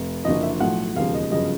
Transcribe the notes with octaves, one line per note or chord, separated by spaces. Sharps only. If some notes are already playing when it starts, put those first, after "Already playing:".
Already playing: F1
F#1 F#2 D3 F3 D#5
E5
B1 A2 F3 F#5
E1 D#2 C#3 F3 F5
D#5
G1 F#2 C#3 F3 D#5